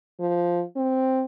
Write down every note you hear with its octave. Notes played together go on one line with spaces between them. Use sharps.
F3
C4